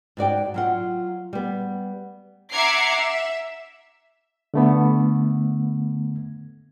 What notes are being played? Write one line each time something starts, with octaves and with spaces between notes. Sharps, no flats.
G#2 F#4 D5 G5
F#3 F4 F#5
G3 B3
E5 F#5 A#5 D6 G#6 C7
E5
D3 A3 B3